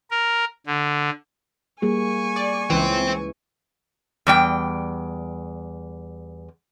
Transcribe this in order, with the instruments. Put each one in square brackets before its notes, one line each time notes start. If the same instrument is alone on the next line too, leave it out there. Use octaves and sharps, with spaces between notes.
[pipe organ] A#4
D3
[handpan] G3 A#3 G#4 [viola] G#5 C#6
[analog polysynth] D5
[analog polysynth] C#2 E3 [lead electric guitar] C5 G5
[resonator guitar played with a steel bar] E2 G3 G5